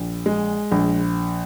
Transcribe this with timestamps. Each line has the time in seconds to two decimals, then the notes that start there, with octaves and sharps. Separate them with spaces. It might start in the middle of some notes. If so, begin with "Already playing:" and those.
Already playing: A#1
0.26 G#3
0.71 A#1